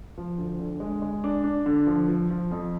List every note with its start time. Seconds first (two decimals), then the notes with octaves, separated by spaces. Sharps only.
0.17 F3
0.38 D2
0.59 D3
0.80 G#3
1.02 G#3
1.24 D4
1.44 D4
1.66 D3
1.87 F3
2.08 F3
2.30 F3
2.52 F2